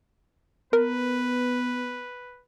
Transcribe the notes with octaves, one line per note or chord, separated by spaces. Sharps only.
B3 A#4 B4